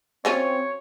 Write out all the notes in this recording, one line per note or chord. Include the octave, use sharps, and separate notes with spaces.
F#3 C4 C#4 F4 C#5